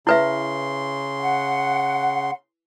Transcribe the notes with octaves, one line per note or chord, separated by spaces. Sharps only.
C#3 E4 B4 E5 C6
F#5